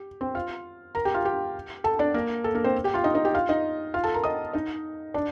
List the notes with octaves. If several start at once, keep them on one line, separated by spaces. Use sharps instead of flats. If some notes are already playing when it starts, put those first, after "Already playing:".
Already playing: G4
C4 C5
F4 F5
A#4 A#5
G4 G5
F4 F5
G4 G5
A4 A5
D4 D5
A#3 A#4
A4
A#3 A#4
C4 C5
G4 G5
F4 F5
D#4 D#5
D#4 D#5
G4 G5
F4 F5
D#4 D#5
F4 F5
A4 A5
A#4 A#5
D#5 D#6
D#4 D#5
D4 D5